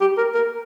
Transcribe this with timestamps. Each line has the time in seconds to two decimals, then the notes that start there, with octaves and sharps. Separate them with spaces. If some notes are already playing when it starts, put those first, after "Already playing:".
0.01 G4
0.17 A#4
0.34 A#4